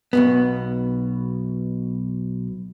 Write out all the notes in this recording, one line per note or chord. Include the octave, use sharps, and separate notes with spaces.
B1 B2 B3